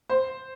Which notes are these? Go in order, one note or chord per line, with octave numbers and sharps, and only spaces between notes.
C5